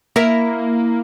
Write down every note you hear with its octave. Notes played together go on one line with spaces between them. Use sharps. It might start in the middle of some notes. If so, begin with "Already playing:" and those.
A#3 E4 A#4 E5